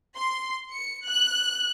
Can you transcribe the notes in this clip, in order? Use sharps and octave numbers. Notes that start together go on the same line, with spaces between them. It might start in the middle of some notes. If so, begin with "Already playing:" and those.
C6
C#7
F#6